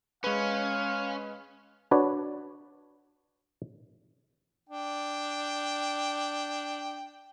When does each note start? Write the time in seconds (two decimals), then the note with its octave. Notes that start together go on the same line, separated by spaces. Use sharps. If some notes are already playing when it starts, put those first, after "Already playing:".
0.24 G#3 C#4 B4 F5
1.91 D4 F#4 B4 C#5 D5
4.69 D4 G5